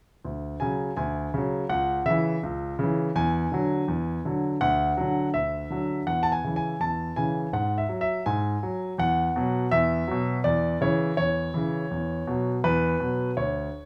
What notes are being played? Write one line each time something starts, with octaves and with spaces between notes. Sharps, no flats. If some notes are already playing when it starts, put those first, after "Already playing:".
D2
C#3 F#3 G#5
D2 G#5
C#3 F#3
C#2 F#5
C#3 E3 E5
C#2
C#3 E3
E2 G#5
D3 F#3
E2
D3 F#3
D2 F#5
D3 F#3
D2 E5
D3 F#3
E2 F#5
A5
G#5
C#3 E3
G#5
E2 A5
C#3 E3 G#5
G#2 F#5
E5
F#3
E5
G#2 G#5
F#3
E2 F#5
B2 F#3
E2 E5
B2 F#3
E2 D5
C#3 E3 C#5
E2 C#5
C#3 E3
E2
B2 F#3
E2 B4
B2 F#3
D2 C#5